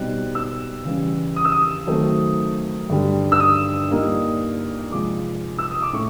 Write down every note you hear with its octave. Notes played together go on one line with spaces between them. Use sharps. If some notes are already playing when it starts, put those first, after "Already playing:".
Already playing: B2 G3 C4 D#4 F#6
E6
C#3 E3 G3
D#6
E6
D#6
D#3 F#3 A3 C4
G2 D3 G3
E6
D#6
A#2 G3 A#3 D#4
C3 F3 G#3 D6
E6
D#6
D6
A2 C#6